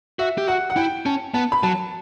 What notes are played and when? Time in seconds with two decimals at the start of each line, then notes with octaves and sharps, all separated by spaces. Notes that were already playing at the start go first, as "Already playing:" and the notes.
0.19 F#4 E5
0.38 G4
0.47 F#4 F#5
0.70 F#5
0.76 E4 G5
1.06 C#4 A5
1.34 B3 A5
1.52 B5
1.63 F#3 A5